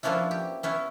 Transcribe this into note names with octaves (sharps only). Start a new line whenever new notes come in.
F3 A#3 B3 C#4 D4 E4
G4
B3 C#4 E4